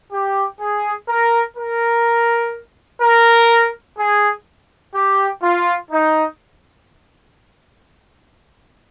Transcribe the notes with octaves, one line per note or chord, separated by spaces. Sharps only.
G4
G#4
A#4
A#4
A#4
G#4
G4
F4
D#4